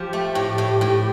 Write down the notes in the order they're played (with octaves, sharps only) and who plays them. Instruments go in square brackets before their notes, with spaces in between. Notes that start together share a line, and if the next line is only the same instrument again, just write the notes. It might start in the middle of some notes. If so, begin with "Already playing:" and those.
Already playing: [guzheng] F3 [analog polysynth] G4
[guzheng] A3
A2
A2
A2